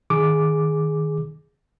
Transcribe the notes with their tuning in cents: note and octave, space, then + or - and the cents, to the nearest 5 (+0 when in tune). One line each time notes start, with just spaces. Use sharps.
D#3 +0 G#4 +0 D6 +0